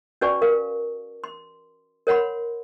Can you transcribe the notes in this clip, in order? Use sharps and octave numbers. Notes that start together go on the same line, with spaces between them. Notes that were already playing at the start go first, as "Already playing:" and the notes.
C#4 F#4 B4 D5 G#5 C#6
A#4 F5
C6
A#4 C#5 F#5 B5 C6